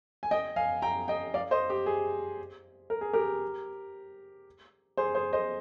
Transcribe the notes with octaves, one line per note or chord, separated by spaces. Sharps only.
G#5
D#5 G5
F5 G#5
G5 A#5
D#5 G5
D5 F5
C5 D#5
G4
G#4
A#4
G#4
G4 A#4
G#4 C5
G#4 C5
C5 D#5